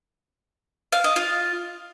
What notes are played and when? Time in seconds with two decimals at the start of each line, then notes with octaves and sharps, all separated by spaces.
0.92 F5
1.04 D#5
1.16 F4